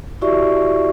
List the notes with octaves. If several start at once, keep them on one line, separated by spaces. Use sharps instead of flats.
E4 F#4 G4 D5 E5 C#6